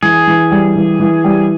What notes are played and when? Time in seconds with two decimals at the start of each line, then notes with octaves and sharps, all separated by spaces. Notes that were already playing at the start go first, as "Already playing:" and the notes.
0.03 E3 G#4
0.27 E3
0.51 G3
0.76 E3
1.00 E3
1.24 G3